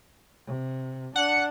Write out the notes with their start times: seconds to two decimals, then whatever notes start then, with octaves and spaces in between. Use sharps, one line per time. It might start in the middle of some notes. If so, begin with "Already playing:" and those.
0.47 C3
1.16 D4 F#5